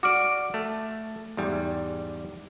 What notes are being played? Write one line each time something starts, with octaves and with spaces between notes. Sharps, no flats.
F#4 D5 D6 F6 D7
A3
E2 G#2 G3